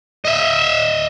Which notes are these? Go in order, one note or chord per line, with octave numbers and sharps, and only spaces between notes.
D#5 E5